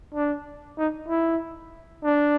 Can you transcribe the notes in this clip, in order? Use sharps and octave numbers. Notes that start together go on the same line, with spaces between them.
D4
D#4
E4
D4